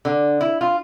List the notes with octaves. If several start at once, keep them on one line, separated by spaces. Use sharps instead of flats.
D3
E4
F4